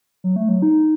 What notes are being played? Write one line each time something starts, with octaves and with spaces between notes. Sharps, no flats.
F#3
A3
F#3
D#4